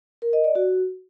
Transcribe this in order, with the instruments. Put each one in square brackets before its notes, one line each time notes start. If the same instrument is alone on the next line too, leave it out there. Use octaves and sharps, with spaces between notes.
[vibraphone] A#4
D#5
D5
F#4